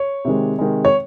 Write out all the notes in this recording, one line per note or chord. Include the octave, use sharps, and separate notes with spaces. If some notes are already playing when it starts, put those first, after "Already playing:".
Already playing: C#5
C3 D#3 G#3
C3 D#3 G#3
C#5